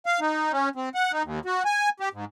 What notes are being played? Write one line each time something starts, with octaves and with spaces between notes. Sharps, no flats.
F5
D#4
C#4
C4
F#5
D#4
D#2
F#4
G#5
G4
G#2